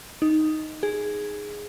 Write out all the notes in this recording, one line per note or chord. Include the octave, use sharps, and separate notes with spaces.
D#4
G#4